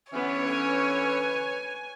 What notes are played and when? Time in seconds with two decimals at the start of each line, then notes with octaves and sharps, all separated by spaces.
0.12 D3 E3 B3 C#4 C#5
0.47 B4 G#5